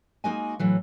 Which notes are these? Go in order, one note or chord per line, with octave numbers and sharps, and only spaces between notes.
G#3 A#3 D#4 F#4 D#5 G#5
A2 E3 F#3